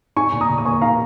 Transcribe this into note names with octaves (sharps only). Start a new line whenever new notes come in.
D#4 G#5 C#6
A#2
A#5 D#6
A#2
D#6
A#3 G#5 C#6
D#4 F5 A#5